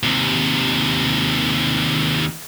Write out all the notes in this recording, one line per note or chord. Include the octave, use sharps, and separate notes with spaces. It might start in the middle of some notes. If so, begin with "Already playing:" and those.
D#2 C3